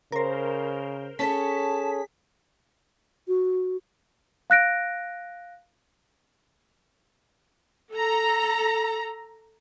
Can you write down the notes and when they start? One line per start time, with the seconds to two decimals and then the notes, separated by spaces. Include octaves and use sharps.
0.12 C#3 A#4 C5
1.19 C#4 G#4 A4 C#5 A5 B6
3.28 F#4
4.50 F5 F#6 A#6 D7
7.91 A4 A#5